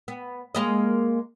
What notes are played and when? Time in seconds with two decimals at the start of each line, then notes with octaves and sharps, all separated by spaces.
0.08 B3
0.55 G#3 A#3 D#5